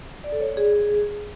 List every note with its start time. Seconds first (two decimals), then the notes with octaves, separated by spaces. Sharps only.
0.24 D5
0.32 A4
0.41 C#5
0.49 D5
0.57 G#4